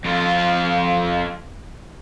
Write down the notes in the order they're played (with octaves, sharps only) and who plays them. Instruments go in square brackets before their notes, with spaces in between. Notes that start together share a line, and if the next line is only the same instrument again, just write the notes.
[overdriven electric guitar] F2 F4